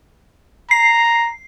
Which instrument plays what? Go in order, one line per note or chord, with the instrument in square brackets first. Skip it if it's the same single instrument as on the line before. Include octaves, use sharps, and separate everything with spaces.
[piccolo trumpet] A#5 [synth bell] C7